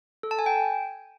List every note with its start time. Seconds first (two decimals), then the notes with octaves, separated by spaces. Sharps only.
0.23 A4
0.31 A5
0.39 G#5
0.46 G5